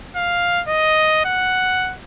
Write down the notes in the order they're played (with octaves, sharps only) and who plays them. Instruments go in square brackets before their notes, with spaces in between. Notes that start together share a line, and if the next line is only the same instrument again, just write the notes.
[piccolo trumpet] F5
D#5
F#5